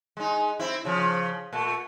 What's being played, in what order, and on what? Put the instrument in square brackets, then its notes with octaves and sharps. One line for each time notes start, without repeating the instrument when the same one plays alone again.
[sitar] G#3 D#4
C4 E4
C#3 F3
A#2 A3